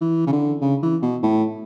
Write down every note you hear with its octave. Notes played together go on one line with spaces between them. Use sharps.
E3
C#3
D3
C#3
E3
B2
A2